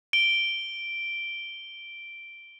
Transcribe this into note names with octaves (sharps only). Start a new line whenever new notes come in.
D7 G7